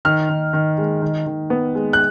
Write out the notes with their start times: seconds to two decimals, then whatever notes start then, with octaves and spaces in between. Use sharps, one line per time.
0.05 D#3 F6
0.29 D#3
0.53 D#3
0.78 G#3
1.02 D#3
1.26 D#3
1.50 B3
1.75 G#3
1.93 F#6